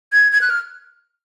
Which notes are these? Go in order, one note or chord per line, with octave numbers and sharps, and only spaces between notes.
G#6
G#6
F#6
F6